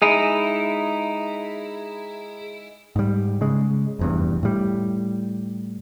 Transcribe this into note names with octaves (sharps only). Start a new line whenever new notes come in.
G#3 D#4 E4 G#4
G#2 G3
C#3 G#3
F1 E2 G2
A2 G3